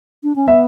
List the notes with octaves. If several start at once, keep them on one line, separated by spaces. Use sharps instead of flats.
D4
C#4
B3 E5